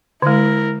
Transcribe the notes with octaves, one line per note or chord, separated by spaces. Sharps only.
D3 G#3 E4 A#4